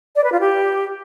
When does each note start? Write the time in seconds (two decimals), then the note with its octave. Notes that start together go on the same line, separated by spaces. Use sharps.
0.16 D5
0.24 B4
0.32 F4
0.40 G4